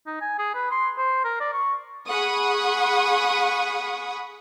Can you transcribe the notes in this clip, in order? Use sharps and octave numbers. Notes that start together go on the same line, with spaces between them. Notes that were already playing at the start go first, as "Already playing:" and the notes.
D#4
G#5
G#4
B4
C6
C5
A#4
D5
C#6
G#4 F#5 B5 C#6 D#6